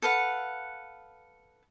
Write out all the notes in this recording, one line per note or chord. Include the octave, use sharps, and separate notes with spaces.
A4 B4 F5 F#5